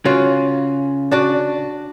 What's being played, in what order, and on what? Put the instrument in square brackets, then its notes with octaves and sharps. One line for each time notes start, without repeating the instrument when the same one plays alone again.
[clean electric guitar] C#3 [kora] F4 F#4 C#5
[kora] D4 F#4 D5